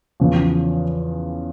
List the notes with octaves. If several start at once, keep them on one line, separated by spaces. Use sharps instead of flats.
E2 C#3 F3